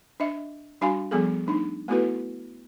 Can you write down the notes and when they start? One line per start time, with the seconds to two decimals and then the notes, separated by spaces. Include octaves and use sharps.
0.20 D4 D#5 E5
0.81 G3 D4 F#4 F5 G#5 C6
1.11 F3 G3 B3 G#4 A4
1.47 A3 D4 D#4
1.88 A3 B3 E4 F#4 A4 B4